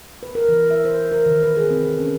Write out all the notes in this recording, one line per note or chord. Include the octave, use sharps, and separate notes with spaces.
B4
A#4
E3
E5
C5
A#4
D#3
B4
G#4
C4
A4
C#4